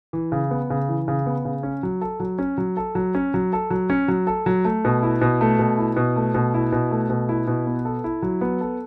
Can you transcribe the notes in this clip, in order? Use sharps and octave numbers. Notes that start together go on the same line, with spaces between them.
E3
C#3
B3
C#3
E3
C#3
B3
C#3
C#4
F#3
A4
F#3
C#4
F#3
A4
F#3
C#4
F#3
A4
F#3
C#4
F#3
A4
F#3
A3
B2
E4
B2
A3
B2
E4
B2
A3
B2
E4
B2
A3
B2
E4
B2
B3
A4
E4
F#3
B3
A4